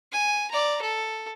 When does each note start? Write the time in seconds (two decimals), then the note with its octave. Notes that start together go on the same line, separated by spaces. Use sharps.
0.12 G#5
0.51 D5 A#5
0.82 A4